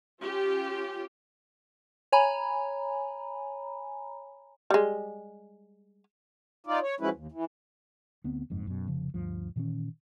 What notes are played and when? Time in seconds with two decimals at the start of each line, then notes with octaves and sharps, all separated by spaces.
0.22 C#4 F4 G4
2.12 C#5 G#5 A#5 B5
4.70 G3 G#3
6.67 D#4 F4 D5
6.82 C#5
7.00 F3 F#3 G#3 C#4 E4 B4
7.13 D#2
7.32 E3
8.24 D2 B3 C4
8.50 F#1 F2 G#2
8.67 F#2 B2
8.87 F1 C#3 F3
9.14 D2 G2 F3
9.56 A#2 D#3 E3 C#4